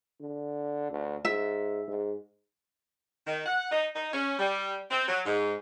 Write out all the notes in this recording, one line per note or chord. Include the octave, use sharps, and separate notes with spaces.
D3
D2
G#2 E5
G#2
D#3
F#5
D#4
D#4
C#4
G3
C4
F#3
G#2